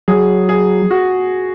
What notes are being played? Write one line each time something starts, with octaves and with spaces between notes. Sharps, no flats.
F#3 G#4
G#4
F#4